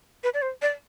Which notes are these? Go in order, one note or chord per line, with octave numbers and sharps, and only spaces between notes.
B4
D5
C5
D5